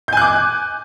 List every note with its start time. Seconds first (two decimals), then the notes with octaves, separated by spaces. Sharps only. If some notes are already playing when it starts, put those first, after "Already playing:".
0.08 G6
0.13 G#5
0.17 F#6
0.22 D6